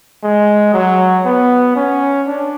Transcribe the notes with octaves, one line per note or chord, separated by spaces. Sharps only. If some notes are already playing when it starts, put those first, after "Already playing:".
G#3
F#3
B3
C#4
D4